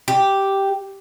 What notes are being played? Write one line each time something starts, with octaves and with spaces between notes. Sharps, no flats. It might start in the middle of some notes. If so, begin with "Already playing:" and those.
G4